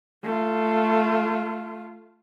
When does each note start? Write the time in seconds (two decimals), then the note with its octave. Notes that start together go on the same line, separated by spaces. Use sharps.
0.23 A3 F4